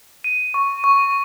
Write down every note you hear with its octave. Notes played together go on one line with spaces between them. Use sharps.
D#7
C#6
C#6